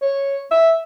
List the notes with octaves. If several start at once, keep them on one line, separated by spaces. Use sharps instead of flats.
C#5
E5